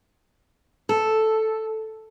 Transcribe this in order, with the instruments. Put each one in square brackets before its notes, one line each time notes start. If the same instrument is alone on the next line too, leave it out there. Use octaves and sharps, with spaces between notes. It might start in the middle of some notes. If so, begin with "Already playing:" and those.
[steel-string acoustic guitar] A4